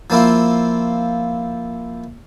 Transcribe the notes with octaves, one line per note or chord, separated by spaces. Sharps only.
F3 A#3 C4 E4 F4